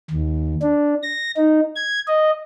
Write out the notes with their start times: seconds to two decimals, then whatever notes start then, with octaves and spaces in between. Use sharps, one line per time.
0.11 D#2
0.62 D4
1.03 A#6
1.37 D#4
1.76 G#6
2.08 D#5